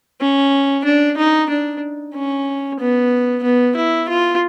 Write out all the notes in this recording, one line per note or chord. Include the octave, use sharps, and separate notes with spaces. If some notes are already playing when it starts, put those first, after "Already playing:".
C#4
D4
D#4
D4
C#4
B3
B3
E4
F4